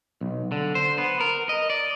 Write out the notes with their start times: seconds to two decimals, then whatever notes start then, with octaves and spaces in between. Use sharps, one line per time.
0.21 B1
0.52 D3
0.75 C5
0.98 B3
1.20 A#4
1.49 D#5
1.70 D5